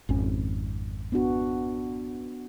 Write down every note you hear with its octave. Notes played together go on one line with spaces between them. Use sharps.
G#1 F2 C#4
B3 D4 F#4